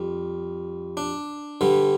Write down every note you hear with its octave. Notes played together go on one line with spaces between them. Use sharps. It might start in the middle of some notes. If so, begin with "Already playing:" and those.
Already playing: F2 G3
D4
G2 D3 G3